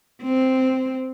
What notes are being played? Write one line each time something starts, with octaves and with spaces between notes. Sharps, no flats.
C4